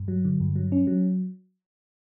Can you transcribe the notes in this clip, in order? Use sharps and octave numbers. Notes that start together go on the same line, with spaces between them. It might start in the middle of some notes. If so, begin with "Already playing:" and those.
Already playing: G2
F#3
D3
G2
F#3
C#4
F#3